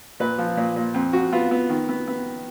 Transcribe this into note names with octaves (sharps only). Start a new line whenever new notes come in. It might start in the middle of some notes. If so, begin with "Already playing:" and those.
A#2 B4
F3
A#2
A#2
F2
F2 F#4
B3 F4
B3
D#3
B3
B3